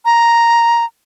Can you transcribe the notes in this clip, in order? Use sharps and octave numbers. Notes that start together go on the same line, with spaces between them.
A#5